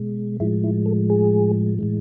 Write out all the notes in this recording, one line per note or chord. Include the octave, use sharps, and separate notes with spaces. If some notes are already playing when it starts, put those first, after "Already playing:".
Already playing: B2 G#3
A2 F3 G#3 E4
E4
A4
G#4
A2 E3 G#3